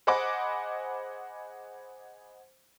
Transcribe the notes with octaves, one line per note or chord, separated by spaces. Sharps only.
G#4 C5 D#5 F#5 B5 D6